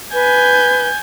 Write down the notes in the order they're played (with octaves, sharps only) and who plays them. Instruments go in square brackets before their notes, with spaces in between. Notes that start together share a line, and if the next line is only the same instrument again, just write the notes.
[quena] B4 [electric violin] G#5 G6